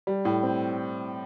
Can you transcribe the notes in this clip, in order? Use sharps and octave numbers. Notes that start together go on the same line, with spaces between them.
G3
A2
C4